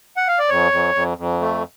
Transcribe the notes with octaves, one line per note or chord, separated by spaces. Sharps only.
F#5
F5
D5
F2 C#5
F2
F2
F2
A3